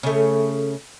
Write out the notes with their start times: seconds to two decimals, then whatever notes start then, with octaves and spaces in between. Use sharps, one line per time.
0.03 C#3 A3